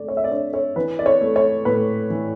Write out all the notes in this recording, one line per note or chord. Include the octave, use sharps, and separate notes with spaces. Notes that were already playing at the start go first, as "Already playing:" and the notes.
Already playing: D3 A3 D5
C#5
E5
D5
D4 C#5
C#5
E3 B4
D5
C#5
A3
C#5
A2 B4
E3